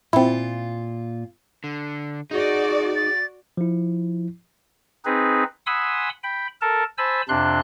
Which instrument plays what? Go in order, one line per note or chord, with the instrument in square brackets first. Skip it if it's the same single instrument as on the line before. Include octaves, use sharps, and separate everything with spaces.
[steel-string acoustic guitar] A#2 F4 [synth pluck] C4 E4
[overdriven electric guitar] D3
[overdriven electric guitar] D#4 [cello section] F#4 D5 [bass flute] G#4
[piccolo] A6
[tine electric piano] F3 E4
[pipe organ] C4 D#4 G#4 B4
F#5 G#5 B5 C6 D#6 E6
G5 B5
A4 A#4 A5
C5 G#5 A5 B5 E6
F2 C3 D4 C6 F#6